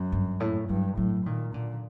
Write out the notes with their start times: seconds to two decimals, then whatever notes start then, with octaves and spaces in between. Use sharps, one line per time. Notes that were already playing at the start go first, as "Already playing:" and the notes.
Already playing: F#2
0.12 G2
0.40 A2
0.69 G2 F#3
0.97 A2 F#3
1.25 A#2 D#3
1.54 A#2 D3